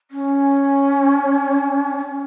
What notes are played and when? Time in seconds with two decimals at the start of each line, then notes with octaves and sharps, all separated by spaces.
0.11 C#4
1.98 C#4